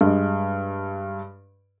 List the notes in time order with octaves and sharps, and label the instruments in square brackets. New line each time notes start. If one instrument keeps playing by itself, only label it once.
[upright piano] G2 G#3